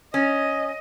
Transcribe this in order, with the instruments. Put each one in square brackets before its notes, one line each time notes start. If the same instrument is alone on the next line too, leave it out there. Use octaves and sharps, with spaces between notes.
[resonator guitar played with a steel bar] C#4 [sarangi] D#5